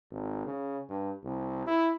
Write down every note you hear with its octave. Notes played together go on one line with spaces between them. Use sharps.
G#1
C#3
G2
C2
E4